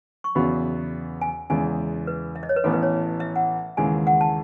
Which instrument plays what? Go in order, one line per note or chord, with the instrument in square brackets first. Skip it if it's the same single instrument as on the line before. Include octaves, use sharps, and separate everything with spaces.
[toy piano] C#6
[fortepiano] E2 C#3 F#3 B3 F#4 [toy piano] B5
[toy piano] G#5
[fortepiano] E2 C#3 E3 G#3 B3 [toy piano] G#5
[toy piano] B4
E5
D#5
C#5
B4
[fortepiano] A1 A2 E3 B3 [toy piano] A4
[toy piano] B4
C#5
E5
F#5
[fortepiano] D#2 C#3 E3 G#3 [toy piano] G#5
[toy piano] F#5
A5